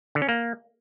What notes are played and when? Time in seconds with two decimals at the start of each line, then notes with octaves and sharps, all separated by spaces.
0.15 D3
0.22 C#4
0.29 A#3